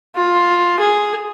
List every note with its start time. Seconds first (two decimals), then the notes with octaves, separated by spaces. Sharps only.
0.16 F4
0.80 G#4